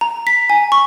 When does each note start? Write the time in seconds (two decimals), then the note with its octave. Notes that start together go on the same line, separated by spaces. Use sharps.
0.01 A#5
0.27 B6
0.50 G#5
0.72 C#6